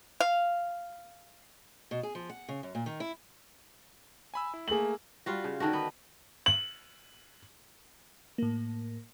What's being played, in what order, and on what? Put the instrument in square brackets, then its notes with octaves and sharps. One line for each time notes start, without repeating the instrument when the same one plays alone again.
[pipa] F5
[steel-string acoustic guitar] B2
G#4
F3
F#5
C#3
F#2
A#2
D#3
E4
[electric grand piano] G#5 B5 E6
E4
[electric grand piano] A3 A#3 [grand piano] G#4 F#7
[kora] G3 F4 F#4
C#3
D3 D#3 D4 F#4
B3
[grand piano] F#7
[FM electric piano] A2 A#3